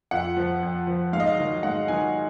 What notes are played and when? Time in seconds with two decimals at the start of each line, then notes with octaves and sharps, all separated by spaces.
0.11 F2 F#5
0.37 F3
0.63 F2
0.87 F3
1.13 G#2 F5
1.20 D#5
1.27 F5
1.38 D#3 F#3
1.63 G#2 F#5
1.88 D#3 F#3 G#5